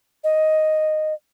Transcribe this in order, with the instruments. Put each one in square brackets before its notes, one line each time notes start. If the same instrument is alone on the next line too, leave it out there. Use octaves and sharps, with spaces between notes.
[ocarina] D#5